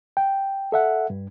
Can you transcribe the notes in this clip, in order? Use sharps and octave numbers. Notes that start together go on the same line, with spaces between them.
G5
A4 E5 F#5
G2